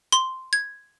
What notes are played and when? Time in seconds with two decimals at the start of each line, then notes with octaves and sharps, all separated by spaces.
0.12 C6
0.53 G#6